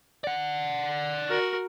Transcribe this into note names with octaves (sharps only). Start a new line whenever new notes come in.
D5 F#5
F#4 A#4